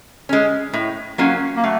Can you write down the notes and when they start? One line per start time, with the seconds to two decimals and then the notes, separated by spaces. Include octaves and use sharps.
0.29 G#3 C#4
0.73 A2
1.18 F#3 A#3 C#4 F4
1.57 A#3
1.64 F#3 A3